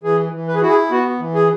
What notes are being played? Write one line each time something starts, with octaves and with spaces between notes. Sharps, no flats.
E3 G#4
E3
B4
G#4
E4 F#4
G#4
B3 F#4
E3
G#4